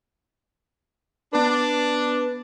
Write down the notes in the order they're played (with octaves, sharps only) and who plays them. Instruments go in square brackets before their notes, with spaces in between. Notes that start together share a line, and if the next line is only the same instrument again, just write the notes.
[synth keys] B3 B4 [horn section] D4